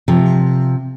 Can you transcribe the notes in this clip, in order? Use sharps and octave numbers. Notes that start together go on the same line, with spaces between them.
C3 F3